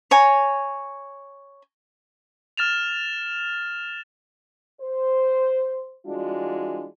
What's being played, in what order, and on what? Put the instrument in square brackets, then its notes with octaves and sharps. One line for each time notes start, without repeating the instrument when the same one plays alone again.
[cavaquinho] C#5 G#5 A#5
[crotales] F6 A6 E7 F7
[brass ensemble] C5
E3 G3 G#3 D4 F4 F#4